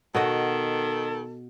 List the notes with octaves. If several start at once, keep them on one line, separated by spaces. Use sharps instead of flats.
B2 D#3 F#4 A4 D#5